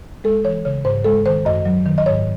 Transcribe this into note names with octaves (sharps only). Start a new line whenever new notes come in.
G#3 A4
E3 C#5
C#3 C#5
G#2 C5
G#3 A4
D#3 C5
F#2 D#5
F#3
D#3
D#5
G#2 C#5